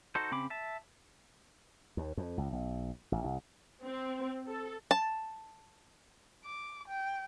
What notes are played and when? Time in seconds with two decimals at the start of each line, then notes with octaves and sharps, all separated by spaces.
0.15 D#4 F#4 A4 C5
0.31 C#3 C4 B5 D6
0.50 E5 A5
1.97 D#2
2.17 F2
2.38 C#2
2.53 B1
3.12 A1
3.24 C2
3.84 C4
4.48 A4
4.91 A5
6.44 D6
6.88 G5